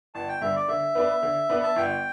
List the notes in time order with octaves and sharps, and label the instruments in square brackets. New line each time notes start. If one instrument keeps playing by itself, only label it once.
[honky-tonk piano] G1 [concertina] A5
[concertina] G5
[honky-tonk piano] G2 D3 [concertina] E5
[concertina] D5
[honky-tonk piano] D3 [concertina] E5
[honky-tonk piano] B3 D4 B4
D3
B3 D4 B4
[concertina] A5
[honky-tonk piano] G1 [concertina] G5